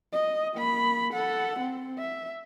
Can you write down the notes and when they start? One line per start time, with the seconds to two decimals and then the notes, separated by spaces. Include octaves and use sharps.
0.13 D#5
0.54 A#3 B5
1.13 A4 F#5
1.60 C4
1.98 E5